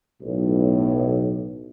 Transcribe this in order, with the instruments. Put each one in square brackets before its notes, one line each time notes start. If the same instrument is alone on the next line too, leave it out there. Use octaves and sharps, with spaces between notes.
[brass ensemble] B1 A2